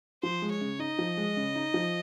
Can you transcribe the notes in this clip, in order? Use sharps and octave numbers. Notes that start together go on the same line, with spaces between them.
F3 C5
G#3
C#5
C#3
D#4 D#5
F3
G#3
C#3
D#4
F3